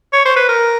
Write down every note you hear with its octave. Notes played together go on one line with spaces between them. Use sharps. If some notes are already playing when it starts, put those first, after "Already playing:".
C#5
C5
B4
A#4